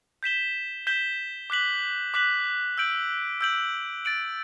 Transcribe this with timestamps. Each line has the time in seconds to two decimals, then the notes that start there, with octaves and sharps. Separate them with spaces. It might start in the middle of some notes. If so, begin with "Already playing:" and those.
0.23 G6 B6 E7 G7
0.87 G6 B6 E7 G7
1.50 D6 F#6 B6 F#7
2.14 D6 F#6 B6 F#7
2.78 E6 G6 D7 F#7
3.41 E6 G6 D7 F#7
4.05 A6 D7 F#7